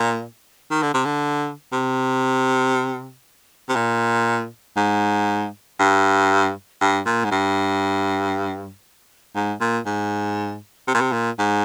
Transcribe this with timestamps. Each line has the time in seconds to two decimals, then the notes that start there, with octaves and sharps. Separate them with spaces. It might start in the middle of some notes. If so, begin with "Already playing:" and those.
Already playing: A#2
0.71 D#3
0.82 D3
0.94 C3
1.05 D3
1.72 C3
3.69 C3
3.76 A#2
4.77 G#2
5.80 G2
6.81 G2
7.06 A#2
7.24 G#2
7.31 G2
9.35 G#2
9.61 A#2
9.86 G#2
10.87 C3
10.94 A#2
11.01 C3
11.12 A#2
11.39 G#2